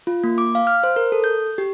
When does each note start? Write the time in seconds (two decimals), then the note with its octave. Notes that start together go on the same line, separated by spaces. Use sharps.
0.07 F4
0.24 A#3
0.38 D6
0.55 F5
0.67 F6
0.84 C5
0.96 A#4
1.12 A4
1.24 G6
1.58 G4